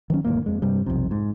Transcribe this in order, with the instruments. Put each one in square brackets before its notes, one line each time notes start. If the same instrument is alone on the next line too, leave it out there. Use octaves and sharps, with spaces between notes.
[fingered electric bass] D#3 F#3 C#4
E1 D2 G#2 A#3
F2 G#3
G2 C3 G3
B1 F2 C3
G#2